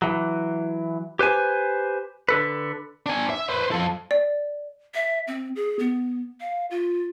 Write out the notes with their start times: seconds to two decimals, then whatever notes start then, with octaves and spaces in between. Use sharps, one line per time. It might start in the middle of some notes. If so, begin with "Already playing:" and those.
0.02 E3 F#3
1.19 G4 B4 C5 G#5
2.29 D3 A4 B4
3.06 D4 G#5
3.30 E5
3.49 B4 C5
3.72 F3 A4
4.11 D5
4.94 E5
5.27 C4
5.56 G#4
5.79 B3
6.41 F5
6.71 F4